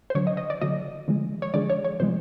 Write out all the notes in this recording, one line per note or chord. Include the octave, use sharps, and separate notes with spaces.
C5
D3 F#3 C#5
D#5
D#5
D5
D3 F#3 D#5
D3 F3 G#3
C#5
D3 F3 G#3 D5
C#5
C#5
C3 F3 G#3 C5